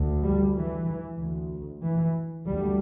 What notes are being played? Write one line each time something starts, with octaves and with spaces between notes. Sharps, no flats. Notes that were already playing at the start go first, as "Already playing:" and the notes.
Already playing: D2
G3
E3
D2
E3
D2 G3